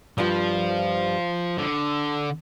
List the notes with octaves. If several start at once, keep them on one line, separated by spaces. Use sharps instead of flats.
G2 F3 G3 F4
D3